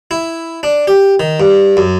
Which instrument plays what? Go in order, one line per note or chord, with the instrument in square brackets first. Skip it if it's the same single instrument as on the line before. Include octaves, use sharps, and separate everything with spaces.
[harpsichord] E4
D4
G4
D#3
G2
F#2